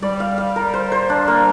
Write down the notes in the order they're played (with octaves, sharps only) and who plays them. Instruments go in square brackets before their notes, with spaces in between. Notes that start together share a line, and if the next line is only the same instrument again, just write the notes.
[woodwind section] G3 [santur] D5
[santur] F5
F5
A#4
C5
C5
D4
A#3